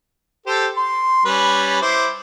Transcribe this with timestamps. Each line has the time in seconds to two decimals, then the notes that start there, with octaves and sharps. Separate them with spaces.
0.46 G4 A4 C5
0.77 C6
1.25 G3 C#4 B4
1.82 E4 C5 D6